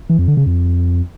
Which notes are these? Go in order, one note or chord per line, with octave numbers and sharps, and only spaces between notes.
E3
F2
D3
C#3
F2